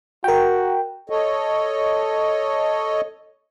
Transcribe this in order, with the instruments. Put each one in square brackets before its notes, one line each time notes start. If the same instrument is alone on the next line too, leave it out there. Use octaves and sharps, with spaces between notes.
[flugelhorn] F#4 [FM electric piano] A#4 G5
[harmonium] A4 C#5 D#5